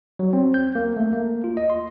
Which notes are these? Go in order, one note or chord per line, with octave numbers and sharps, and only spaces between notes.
F#3
C4
G6
A#3
A3
A#3
F4
D#5
C6